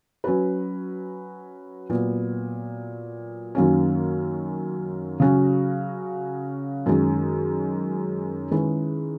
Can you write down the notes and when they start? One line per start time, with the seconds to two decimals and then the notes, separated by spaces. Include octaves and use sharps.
0.24 F#3 C#4 F#4 B4
1.90 A#2 F#3 B3
3.55 F#2 D#3 F#3 A#3 C#4
5.20 C#3 F#3 C#4 F#4
6.86 F#2 D#3 G#3 C#4
8.51 D#3 G#3 C#4 E4 B4